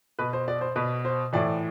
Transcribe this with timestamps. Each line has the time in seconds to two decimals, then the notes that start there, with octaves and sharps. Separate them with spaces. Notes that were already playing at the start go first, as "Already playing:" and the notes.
0.19 B2 B4
0.33 C5
0.48 D5
0.61 C5
0.76 B2 B4
1.05 C5
1.33 A2 E3 D5